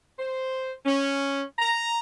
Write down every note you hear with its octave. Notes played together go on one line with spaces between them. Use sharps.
C5
C#4
A#5